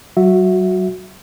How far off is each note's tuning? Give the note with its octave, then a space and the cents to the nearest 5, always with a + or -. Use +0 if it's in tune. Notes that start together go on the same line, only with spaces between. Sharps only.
F#3 +35 F#4 -15 E5 +0